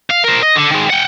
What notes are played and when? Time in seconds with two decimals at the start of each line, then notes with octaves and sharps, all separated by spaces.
0.10 F5
0.24 A#4 C5
0.42 D#5
0.55 D3
0.71 D#3 G#3
0.90 F#5 G5